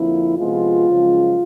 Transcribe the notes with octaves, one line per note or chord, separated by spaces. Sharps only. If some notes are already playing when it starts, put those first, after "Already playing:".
Already playing: F2 D3 F3 A#3 E4
C3 F3 G#3 B3 F4
F#2 C#3 F3 G#3